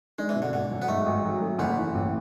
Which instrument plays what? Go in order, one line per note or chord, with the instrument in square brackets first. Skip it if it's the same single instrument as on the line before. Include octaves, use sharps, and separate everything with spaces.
[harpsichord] G#3 [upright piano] D4
[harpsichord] E3
[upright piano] B2
[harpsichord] D3
[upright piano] G#1 [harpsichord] D3
[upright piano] F#2
[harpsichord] B3
[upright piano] G#2 [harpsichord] A3
[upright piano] G#1
F#3
A3
[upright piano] F#1 [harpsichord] B3
[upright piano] E3
A1